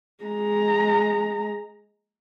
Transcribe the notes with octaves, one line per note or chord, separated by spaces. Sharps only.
G#3 A#5